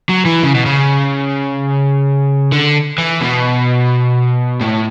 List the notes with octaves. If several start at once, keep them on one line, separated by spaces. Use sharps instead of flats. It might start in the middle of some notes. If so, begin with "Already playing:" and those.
F#3
E3
C#3
B2
C#3
D3
E3
B2
A2